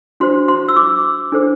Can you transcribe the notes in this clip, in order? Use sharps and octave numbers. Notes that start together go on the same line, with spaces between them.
D4 F#4 C5 C6
C6
E6
D6
D4 A4 C5